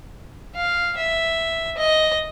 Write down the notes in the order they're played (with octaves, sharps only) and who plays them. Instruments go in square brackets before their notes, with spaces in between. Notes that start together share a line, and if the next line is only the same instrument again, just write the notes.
[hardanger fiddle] F5
E5
D#5